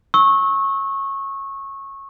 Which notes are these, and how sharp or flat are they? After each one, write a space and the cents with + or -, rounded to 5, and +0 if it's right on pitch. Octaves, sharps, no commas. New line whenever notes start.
C#6 -20 E6 -30